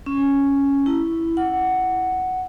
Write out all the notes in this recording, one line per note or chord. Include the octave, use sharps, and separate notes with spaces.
C#4
E4
F#5